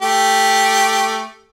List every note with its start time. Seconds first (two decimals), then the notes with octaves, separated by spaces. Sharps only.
0.02 A3 G4